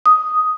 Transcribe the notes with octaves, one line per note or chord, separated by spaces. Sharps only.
D#6